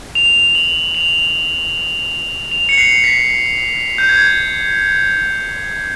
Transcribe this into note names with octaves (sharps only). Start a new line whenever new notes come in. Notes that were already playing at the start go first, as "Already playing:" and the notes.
F7
F#7
F7
F7
C#7
C7
B6
G6
G#6